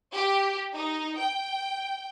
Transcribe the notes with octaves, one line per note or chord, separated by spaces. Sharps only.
G4
D#4
G5